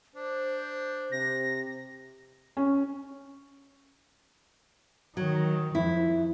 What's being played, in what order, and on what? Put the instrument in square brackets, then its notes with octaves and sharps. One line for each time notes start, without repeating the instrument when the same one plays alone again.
[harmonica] D4 [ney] C5
[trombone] C3 [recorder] A#6
[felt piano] C#4
[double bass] D#3 [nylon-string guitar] F#3
[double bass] F2 [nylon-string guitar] E4